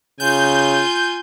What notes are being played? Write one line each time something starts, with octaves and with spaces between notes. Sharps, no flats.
C#3 F4 G#5 G6